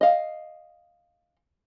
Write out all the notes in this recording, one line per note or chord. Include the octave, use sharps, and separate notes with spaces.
D#5 F5